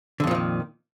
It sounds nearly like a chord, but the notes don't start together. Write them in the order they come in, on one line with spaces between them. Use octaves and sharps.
D3 F2 A#2 F3 D#3